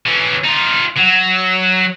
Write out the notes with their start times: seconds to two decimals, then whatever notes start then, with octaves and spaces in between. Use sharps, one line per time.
0.06 E3 C#4
0.44 D#4 F4
0.97 F#3